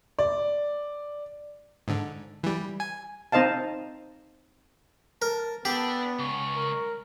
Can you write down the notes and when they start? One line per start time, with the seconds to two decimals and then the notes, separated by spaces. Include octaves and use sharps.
0.19 D5
1.88 G#2 D3
2.43 E3 G3
2.80 G#5
3.32 C4 D#4 C5 D#5 F5 A5
5.22 A#4 A5
5.65 B3 D4 G4 A4
6.19 C#2 C#6
6.55 A#4